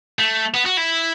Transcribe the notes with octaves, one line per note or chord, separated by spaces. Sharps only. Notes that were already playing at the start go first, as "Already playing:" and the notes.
A3
B3
F#4
E4